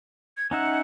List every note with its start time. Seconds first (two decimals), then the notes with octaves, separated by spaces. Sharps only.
0.37 G#6
0.51 C#4 D#4 E5 F#5